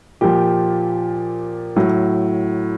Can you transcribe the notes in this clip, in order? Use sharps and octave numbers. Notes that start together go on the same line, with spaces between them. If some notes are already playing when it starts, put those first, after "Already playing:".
A#2 F3 G4
A2 F#3